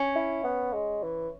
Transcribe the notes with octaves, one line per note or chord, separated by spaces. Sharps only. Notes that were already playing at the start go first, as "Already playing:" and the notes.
Already playing: C#4
E4
B3
G#3
E3